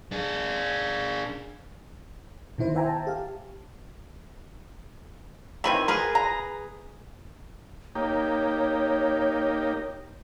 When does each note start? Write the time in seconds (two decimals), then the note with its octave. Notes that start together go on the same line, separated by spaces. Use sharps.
0.12 D4 G#4
2.58 B2 D#3 E4 C5
2.75 C5 E5 G5 G#5 A#5
2.88 A5
3.07 G4 F5
5.64 D#3 E3 C4 G#5 B5
5.88 G#4 A#4 B4
6.15 A#5
7.95 A#3 D#4 G4 C#5